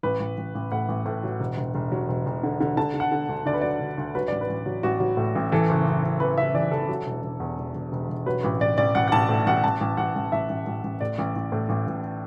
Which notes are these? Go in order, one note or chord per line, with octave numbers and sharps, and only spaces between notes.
A1 B4
A1
A1
A1
A2 F#5
A1
A2
F#3
E1
E1
E1
F#3
E1
E1
D3
D3
D3 A5
D3
F#5
D3
D2
D2 D5
B4
F#3 D5
D2
D2
F#3 B4
A1 D5
B4
A1
F#3
A1 F#4
F#3
A2
A1
E3 A4
F#1
F#1
F#1
E3 B4
F#1 E5
E3 D5
E3 A4
F#3
E1
E1
E2
E1
E1
E1
E1
F#3 B4
A1 B4
A1 D5
A1 D5
A1 F#5
F#5
A1 A5
A2
A1 F#5
A1 A5
A1
A1 F#5
A1
A1 E5
A1
A1
A1
A2 D5
A1
A1
A2
A1
A1